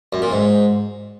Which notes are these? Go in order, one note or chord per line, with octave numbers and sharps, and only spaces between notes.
F#2
A#2
G#2